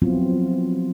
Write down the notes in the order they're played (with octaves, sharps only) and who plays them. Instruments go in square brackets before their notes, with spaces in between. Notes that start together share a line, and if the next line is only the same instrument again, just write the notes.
[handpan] F3 F#3 B3 C4 E4 F4